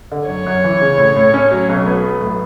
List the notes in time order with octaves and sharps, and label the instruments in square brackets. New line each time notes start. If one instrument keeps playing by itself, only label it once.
[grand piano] D3
[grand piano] F#2 [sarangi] C#5
[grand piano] F#2
E3
C#3
A2
A2
C#4
F#3
B1
B3
F#3
A2